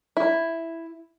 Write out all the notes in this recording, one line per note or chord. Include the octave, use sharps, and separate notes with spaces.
E4